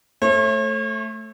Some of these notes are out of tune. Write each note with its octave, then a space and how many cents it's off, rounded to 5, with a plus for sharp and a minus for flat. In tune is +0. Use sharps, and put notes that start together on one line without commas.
A3 +0 C#5 -45